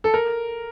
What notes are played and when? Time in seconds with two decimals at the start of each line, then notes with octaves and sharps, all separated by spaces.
0.04 A4
0.14 A#4